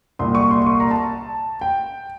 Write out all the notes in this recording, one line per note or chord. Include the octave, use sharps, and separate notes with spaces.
C2 A#2 G3 C6
C#6
C6
C6
C#6
A#5
A5
G5